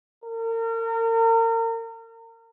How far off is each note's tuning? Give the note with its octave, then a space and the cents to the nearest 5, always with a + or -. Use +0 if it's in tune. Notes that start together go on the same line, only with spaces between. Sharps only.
A#4 -35